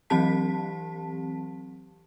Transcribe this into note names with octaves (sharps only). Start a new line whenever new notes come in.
E3 F#3 C4 G4 A5 B6